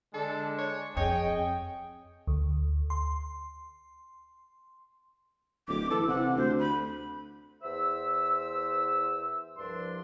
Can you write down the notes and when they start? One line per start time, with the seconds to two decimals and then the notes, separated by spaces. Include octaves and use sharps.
0.14 D3 G#3 D4 A4
0.58 C#5
0.97 F2 G#4 C#5 D#5 G5
2.27 D2
2.90 C6
5.68 D1 D6
5.90 E3 A4
6.08 C3 F#5
6.36 D2 C5
6.59 B5
7.63 E2 C5 E5 E6
9.57 C2 G2 F3 D4 C6